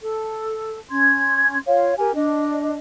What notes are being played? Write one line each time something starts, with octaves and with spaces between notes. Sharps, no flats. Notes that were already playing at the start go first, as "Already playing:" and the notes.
A4
C#4 C6 G#6
F4 C#5 F5
G4 A#4 G#5
D4 D#5